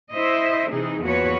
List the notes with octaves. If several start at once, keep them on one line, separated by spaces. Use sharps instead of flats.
E4 C5 D#5 E5
C3 E3 D#4 G#4
E2 F3 A#3 F#4 B4 C#5